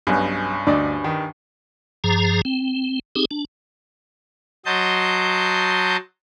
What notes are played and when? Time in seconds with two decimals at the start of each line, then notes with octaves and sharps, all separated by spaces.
0.07 B1 G2 B2 C#4 B4
0.67 D2 D4 D5 D#5
1.04 D#3 C6
2.04 G2 F3 G#4 A#5
2.45 C4
3.16 C4 D#4 G4 G#4
3.31 D4
4.65 F#3 D#5 A5 C6 G6